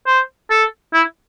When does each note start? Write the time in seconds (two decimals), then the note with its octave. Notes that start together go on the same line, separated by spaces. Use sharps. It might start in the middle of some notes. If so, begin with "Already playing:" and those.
0.06 C5
0.50 A4
0.94 E4